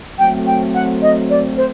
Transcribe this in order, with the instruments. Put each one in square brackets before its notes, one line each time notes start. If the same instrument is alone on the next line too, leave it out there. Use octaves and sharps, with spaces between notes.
[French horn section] F#3 A3 C4 [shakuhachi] G5
[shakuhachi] G5
F#5
D#5
D5
C5